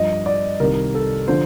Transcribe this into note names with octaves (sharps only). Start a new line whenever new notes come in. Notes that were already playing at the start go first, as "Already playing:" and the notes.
Already playing: G2 F3 D#5
D5
C2 C3 D#3 A#4
A4
D3 F3 C5